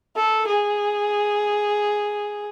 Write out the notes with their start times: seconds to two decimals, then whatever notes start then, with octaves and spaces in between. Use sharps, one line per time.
0.16 A4
0.47 G#4